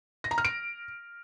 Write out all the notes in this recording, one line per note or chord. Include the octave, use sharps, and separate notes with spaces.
A#6
A#5
F6
D7